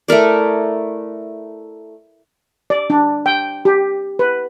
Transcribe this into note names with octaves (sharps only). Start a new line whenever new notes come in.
A3 E4 A#4 D5
D5
D4
G5
G4
B4